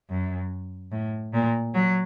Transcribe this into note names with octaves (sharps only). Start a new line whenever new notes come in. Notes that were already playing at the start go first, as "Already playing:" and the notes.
F#2
A2
A#2
F#3